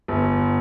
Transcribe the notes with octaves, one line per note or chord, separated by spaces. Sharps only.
G1